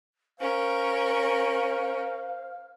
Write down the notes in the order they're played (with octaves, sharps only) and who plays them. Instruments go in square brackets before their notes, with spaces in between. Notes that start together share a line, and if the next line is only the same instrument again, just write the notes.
[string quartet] C#4 A#4 [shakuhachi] C5 [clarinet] F5